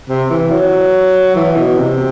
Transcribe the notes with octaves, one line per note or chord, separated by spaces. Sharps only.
C3
E3
F#3
E3
B2
C3